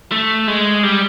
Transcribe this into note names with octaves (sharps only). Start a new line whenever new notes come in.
A3
G#3
G3